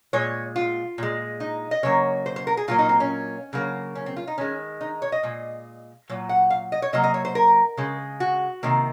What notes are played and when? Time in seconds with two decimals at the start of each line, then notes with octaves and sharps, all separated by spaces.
0.13 A#2 G#3 C#5
0.56 F4
0.98 A#2 G#3
1.40 D#4
1.71 D#5
1.83 C#3 F#3 A#3 C#5
2.26 C5
2.36 C5
2.47 A#4
2.57 G#4
2.68 A#2 F#3 A#3 F4
2.79 D#4
2.89 C4
3.00 C#4
3.53 C#3 F#3 A#3
3.95 C#4
4.06 C4
4.16 F4
4.27 D#4
4.38 D#3 G#3 C#4
4.81 D#4
5.02 C#5
5.12 D#5
5.23 A#2 G#3
6.09 A#2 F#3
6.29 F#5
6.50 F5
6.72 D#5
6.82 C#5
6.93 C3 F#3 A#3 D#5
7.04 D#5
7.14 C#5
7.25 C5
7.35 A#4
7.77 C#3 G#3
8.20 F#4
8.63 C3 D#3 A#3